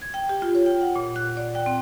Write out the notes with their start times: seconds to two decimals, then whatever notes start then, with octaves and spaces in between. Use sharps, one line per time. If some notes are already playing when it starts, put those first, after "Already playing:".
0.02 G#6
0.14 G5
0.29 G4
0.42 F4
0.55 C#5
0.66 G5
0.81 F#5
0.96 A#2
1.16 F#6
1.37 D5
1.55 G5
1.66 C4